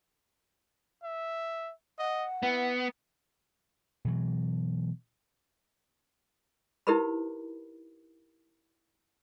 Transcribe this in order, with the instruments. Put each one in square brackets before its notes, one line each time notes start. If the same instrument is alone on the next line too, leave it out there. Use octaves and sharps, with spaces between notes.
[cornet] E5
[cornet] D#5 [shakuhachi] F#5
[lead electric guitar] B3 [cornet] E4
[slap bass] B2 E3 F#3
[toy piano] D#4 E4 G4 A#4 B4 B5